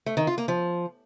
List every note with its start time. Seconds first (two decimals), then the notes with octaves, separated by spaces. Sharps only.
0.06 A3
0.17 D#3
0.27 F4
0.38 A#3
0.48 F3